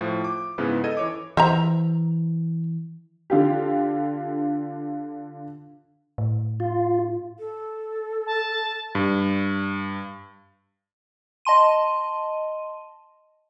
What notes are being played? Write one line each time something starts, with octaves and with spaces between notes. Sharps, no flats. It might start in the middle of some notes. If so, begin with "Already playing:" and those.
A2 F3
D6
G#2 C#3 B3 E4 B4
A4 D#5 G#6 D#7
E3 C#5 D6
E3 C5 E5 A#5
D3 F4 G4
A2
F4
A4
A5
G2
D#5 A5 C6 D#7